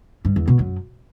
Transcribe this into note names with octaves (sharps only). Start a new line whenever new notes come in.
G2
E2
B2
F#2